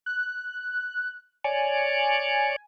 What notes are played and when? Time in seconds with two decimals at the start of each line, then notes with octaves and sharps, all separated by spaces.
0.06 F#6
1.44 C#5 D5 G#5